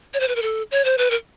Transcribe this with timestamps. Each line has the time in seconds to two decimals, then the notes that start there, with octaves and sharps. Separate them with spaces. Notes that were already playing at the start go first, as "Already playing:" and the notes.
0.14 C#5
0.20 C5
0.28 B4
0.36 A#4
0.42 A4
0.71 C#5
0.85 C5
0.98 B4
1.11 A#4